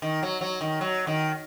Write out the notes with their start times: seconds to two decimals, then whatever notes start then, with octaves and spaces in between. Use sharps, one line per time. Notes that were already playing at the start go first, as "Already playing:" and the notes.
0.02 D#3
0.23 F#3
0.41 F#3
0.61 D#3
0.81 F#3
1.07 D#3